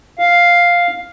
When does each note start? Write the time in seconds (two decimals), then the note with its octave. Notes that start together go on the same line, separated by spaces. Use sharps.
0.19 F5